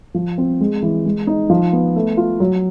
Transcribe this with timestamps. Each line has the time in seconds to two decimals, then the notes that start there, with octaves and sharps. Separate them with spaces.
0.14 F3
0.38 C4
0.61 G#3
0.82 E3
1.06 G#3
1.27 D#4
1.50 F3
1.73 B3
1.96 A3
2.17 F4
2.40 F#3